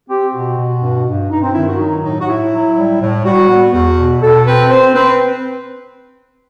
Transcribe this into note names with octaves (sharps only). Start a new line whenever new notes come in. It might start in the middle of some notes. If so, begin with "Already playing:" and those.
C4 G4
B2 F#4
B2
G2
G2
G2 D#4
C4
D#3 E4
F#4
F#3 D#4
A2 D#4
F#4
A2 E4
F#3
G3
A2
G3 F#4
B3
E2 F#4
B2
B2 A4
C4 B4
C4 C5
C4 B4